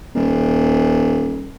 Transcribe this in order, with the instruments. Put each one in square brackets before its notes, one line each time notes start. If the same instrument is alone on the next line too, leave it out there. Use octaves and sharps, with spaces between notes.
[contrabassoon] D#1